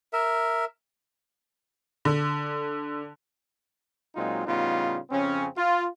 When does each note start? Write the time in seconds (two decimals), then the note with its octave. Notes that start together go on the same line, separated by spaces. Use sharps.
0.13 A#4 E5
2.05 D3
4.15 A#2 F#3 G#3 C4 D#4 F4
4.46 A2 C#3 G3 B3 D#4 F4
5.10 F2 C#3 C4 C#4
5.56 F4